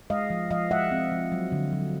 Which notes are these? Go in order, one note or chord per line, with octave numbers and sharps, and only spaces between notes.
G#3 D#5 F5
F3
F3 D#5 F5
G#3 E5 F#5
C4
F3
F#3
D3
F#3